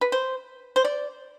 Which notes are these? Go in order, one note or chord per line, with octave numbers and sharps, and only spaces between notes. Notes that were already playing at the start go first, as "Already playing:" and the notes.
B4
C5
C5
D5